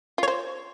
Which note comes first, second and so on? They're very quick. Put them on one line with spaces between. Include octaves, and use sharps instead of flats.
F4 C#5 C5